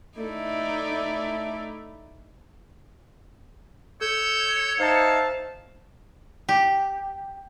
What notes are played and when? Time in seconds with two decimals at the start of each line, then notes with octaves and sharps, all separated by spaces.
0.19 A3 D#4 E4 D5
4.01 A4 C#5 E6 G6
4.80 D#4 C5 E5 F5 A5
6.49 G4